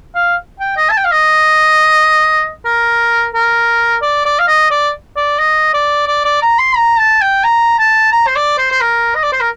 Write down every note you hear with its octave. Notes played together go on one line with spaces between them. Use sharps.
F5
G5
D#5
A5
G5
F5
D#5
A#4
A#4
D5
D5
F5
D#5
D5
D5
D#5
D5
D5
D5
A#5
C6
A#5
A5
G5
A#5
A5
A#5
C5
D5
C5
C5
A#4
D#5
D5
C5
A#4